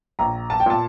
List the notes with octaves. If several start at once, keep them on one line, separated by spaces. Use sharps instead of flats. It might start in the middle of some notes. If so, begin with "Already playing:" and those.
A#1 A#5
A5
G5
A#2 A5